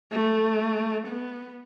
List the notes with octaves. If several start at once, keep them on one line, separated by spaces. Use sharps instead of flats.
A3
B3